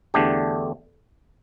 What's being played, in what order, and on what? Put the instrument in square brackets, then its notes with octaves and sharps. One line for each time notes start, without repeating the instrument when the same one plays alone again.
[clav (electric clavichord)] E2 D3 A3 D4 G4